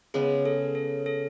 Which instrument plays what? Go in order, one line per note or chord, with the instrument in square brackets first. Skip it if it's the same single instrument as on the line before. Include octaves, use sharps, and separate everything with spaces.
[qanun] C#3 G#3 B3 [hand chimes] G#4
[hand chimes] A4
A4
A4